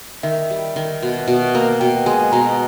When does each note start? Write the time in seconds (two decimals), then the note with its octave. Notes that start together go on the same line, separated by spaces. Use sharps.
0.23 D#3 E5
0.50 G3
0.76 D#3
1.02 B2
1.28 B2
1.55 A#3
1.80 B2 G5
2.06 G#3 G#5
2.32 B2 A#5